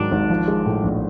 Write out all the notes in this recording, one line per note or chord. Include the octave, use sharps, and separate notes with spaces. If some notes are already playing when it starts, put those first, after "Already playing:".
Already playing: G#2 D#3 F#3 D4
G#1
F3
G#3
A2
A#1